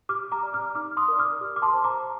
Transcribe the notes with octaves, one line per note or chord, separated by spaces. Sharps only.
G4 D6 F6
A#5 D6
D5
D6 F6
D#4 D6 F6
C6 D#6
A#4 D5
D6 F6
G4
D6
A5 C6
C5
A#5 D6